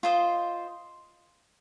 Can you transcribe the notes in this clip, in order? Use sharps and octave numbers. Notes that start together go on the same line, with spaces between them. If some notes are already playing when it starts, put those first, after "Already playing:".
F4 C5 D#5